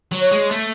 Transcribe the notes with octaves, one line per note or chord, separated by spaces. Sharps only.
F#3
C#5
G#3
A3